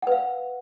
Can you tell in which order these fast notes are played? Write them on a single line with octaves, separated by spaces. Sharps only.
F#5 B4 F5